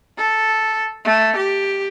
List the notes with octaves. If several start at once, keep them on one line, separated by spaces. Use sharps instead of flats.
A4
A3
G4